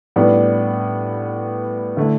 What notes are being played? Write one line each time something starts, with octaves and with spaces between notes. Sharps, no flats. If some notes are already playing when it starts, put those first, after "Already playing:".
A2 G3 B3 D4
D3 A3 E4